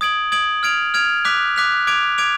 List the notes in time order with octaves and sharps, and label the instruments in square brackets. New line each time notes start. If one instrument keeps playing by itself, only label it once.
[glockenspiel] D#6 G#6 D7 F#7
D#6 G#6 D7 F#7
F6 G#6 D7 F7
F6 G#6 D7 F7
D6 F#6 B6 F7
D6 F#6 B6 F7
D6 G#6 D7 F7
D6 G#6 D7 F7